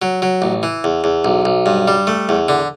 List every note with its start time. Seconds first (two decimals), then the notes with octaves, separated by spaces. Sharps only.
0.02 F#3
0.22 F#3
0.42 A1
0.63 E3
0.84 E2
1.04 E2
1.25 B1
1.45 B1
1.66 G2
1.88 G3
2.07 A3
2.29 E2
2.48 D3